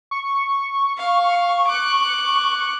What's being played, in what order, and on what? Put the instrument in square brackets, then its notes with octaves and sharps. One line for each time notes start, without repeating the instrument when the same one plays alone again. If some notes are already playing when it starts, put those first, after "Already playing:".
[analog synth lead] C#6
[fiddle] F5
D6 F#6